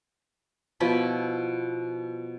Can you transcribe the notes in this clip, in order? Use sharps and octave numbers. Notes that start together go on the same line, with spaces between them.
B2 F3 E4 B5